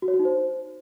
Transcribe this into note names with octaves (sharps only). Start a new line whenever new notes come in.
F#4
C#5
F#4
D#4
C5